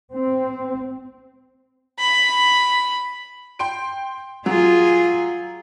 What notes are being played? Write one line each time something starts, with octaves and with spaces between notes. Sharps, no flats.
C4
B5
G5 C6 D7
F#3 F4 G#4